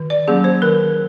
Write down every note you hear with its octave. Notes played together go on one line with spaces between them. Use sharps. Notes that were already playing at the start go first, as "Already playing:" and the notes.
Already playing: D#3
D5
F#3 A#3 C#4 G#4
C5
D#3 A#4